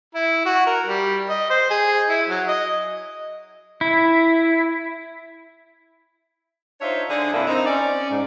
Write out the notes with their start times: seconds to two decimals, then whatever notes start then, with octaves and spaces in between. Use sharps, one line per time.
0.15 E4
0.45 F#4
0.67 A#4
0.86 G3
1.29 D#5
1.50 C5
1.70 G#4
2.09 E4
2.29 F#3
2.47 D#5
3.81 E4
6.81 D4 D#4 F4 C5 C#5 E5
7.10 D3 D4 G#4
7.33 G2 C3 A#3 E4
7.47 C4 D#4
7.66 C#4 D5
8.10 G#2